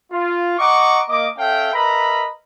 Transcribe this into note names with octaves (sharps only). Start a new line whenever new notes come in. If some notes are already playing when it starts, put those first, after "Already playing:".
F4
D#5 F#5 A#5 C#6 D6
A#3 D#5 D6
C#4 A4 E5 F5 G5
A#4 B4 D#5 E5 A#5 B5